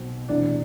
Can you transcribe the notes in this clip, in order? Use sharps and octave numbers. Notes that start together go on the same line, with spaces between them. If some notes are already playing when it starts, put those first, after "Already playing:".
Already playing: B1 B2 C4
E1 D2 C3 E3 D4